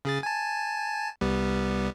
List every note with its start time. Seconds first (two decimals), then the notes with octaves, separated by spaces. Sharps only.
0.05 C#3 G#4 A6
0.23 G#5 A5
1.21 C2 G3 B3